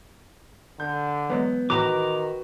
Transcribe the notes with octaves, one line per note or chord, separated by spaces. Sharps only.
D3 G6
E3 F#3 G#3 B3
A2 D#3 E3 F#4 B4 A#5 D6